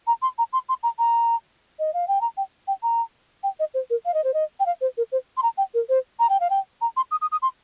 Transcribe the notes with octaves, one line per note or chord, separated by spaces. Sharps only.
A#5
C6
A#5
C6
C6
A#5
A#5
D#5
F5
G5
A#5
G5
G5
A#5
G5
D#5
C5
A#4
F5
D#5
C5
D#5
G5
F5
C5
A#4
C5
C6
A#5
G5
A#4
C5
A#5
G5
F5
G5
A#5
C6
D#6
D#6
D#6
C6